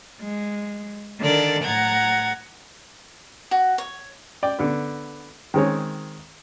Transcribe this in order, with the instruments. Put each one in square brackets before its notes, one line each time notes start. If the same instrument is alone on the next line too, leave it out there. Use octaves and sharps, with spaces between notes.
[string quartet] G#3
D3 D#3 A4 A#4 D5
A2 F#5 A#5 G#6 A6
[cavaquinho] F#4
C#5
[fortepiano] D5 G5
D3 B3
D#3 G#3 C4 C#5